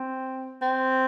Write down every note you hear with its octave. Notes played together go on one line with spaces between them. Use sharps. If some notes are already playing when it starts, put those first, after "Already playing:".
Already playing: C4
C4